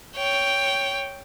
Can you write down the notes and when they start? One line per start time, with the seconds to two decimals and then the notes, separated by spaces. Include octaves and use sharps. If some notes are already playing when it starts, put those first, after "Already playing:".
0.17 C#5 G5